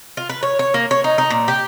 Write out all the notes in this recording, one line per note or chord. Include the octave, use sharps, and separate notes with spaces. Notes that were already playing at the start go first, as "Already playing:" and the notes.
F4
B4
C#5
C#5
A#3
C#5
D#4
D#4
A#2
G4